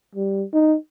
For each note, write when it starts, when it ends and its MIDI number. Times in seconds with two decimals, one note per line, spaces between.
0.15 0.44 55
0.53 0.75 63